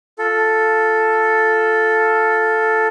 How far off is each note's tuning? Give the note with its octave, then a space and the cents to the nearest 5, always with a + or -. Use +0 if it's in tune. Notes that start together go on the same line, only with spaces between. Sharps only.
F4 +0 A4 +0